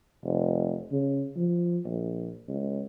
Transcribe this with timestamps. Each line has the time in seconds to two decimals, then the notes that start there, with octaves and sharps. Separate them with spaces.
0.23 F1
0.92 C#3
1.36 F3
1.85 A#1
2.48 C#2